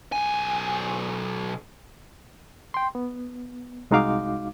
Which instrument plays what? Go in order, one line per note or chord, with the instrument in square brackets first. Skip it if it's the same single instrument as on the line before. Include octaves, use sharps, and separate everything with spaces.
[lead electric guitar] B1 G#5
[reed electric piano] G5 C6
B3
C2 G#3 D#4 F#4 F5 D6